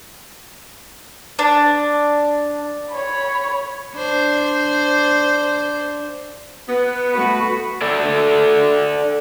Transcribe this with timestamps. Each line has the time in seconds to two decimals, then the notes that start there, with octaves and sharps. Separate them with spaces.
1.39 D4
2.91 C#5 B5
3.96 D4 C5
6.68 B3
7.12 A3 F#4 B4
7.82 D4 A4 D5 E5